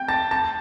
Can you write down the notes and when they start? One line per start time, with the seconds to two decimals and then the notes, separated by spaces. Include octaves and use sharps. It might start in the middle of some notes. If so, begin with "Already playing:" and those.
Already playing: G5 G6
0.08 A5 A6
0.31 A5 A6